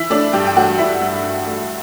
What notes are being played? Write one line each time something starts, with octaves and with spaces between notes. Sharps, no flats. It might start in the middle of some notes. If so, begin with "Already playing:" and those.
Already playing: E3 E4 E5
A3 D4 D5
G2 G4 G5
G5
A3 F#4 F#5
G2 E4 E5
G2
G2
A3